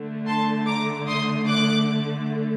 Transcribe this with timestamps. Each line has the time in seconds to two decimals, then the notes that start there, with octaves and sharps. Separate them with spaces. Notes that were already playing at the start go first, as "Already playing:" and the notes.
Already playing: D3 A3
0.26 A5 C6
0.66 A#5 D6
1.07 C6 D#6
1.48 D6 F#6